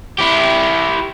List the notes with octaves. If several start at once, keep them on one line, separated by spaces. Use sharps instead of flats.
E4 G4